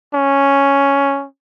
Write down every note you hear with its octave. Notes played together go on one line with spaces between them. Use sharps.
C#4